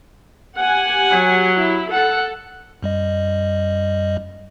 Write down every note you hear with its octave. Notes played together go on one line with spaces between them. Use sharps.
G4 F#5 G#5
F#3
E4
A4 F#5
F#2 G3 D#5